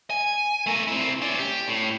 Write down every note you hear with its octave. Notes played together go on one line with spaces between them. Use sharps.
G#5
A3 A#4
C4 E4
C#4 D5
G4
A2